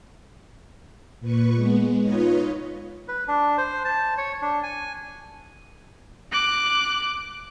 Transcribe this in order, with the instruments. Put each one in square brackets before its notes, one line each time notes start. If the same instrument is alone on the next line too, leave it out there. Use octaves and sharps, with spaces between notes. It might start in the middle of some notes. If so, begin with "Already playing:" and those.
[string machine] A#2 B4 C#6
G#3 B3
D#4 F4 B4 C#5 D#5
[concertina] B4
D4
C5
A5
C#5
D4
G#5
[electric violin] D6 F#6